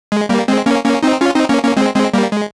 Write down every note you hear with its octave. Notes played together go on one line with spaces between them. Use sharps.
G#3
G3 A#3
G#3 C4
A#3 C#4
A#3 C#4
C4 D#4
C#4 F4
C4 D#4
A#3 C#4
A#3 C#4
G#3 C4
G#3 C4
G3 A#3
G#3